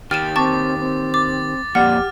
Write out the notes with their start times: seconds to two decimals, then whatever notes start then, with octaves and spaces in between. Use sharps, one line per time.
0.11 D#3 G4 G5 F6 A6 D#7 E7
0.36 C4 A5 C#6 D6 A6
0.79 C4
1.14 D6 A6
1.75 F2 A#3 G4 D5 F#5 F6